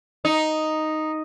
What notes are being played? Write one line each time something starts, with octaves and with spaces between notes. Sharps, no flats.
D#4